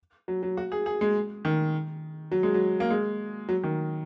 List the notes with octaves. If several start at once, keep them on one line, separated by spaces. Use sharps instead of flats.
F#3
F#3
F#4
G#4
G#4
G#3
D#3
F#3
G#3
F#3
A#3
G#3
F#3
D#3